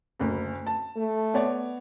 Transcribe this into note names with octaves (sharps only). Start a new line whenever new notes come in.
F#1 D2
A5
A3
B3 C#5 D5